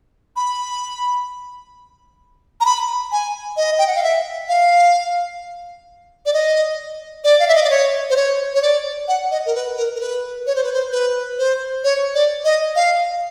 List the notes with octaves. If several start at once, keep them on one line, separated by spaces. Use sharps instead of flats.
B5
A#5
B5
G#5
D#5
G5
F#5
F5
E5
F5
D5
D#5
D5
F5
E5
D#5
D5
C#5
C5
C#5
C#5
D5
F#5
D#5
A#4
B4
A#4
A#4
B4
C#5
C5
B4
C5
B4
C5
C#5
D5
D#5
F5